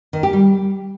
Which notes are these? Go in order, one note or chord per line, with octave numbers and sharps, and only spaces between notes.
D#3
G4
G3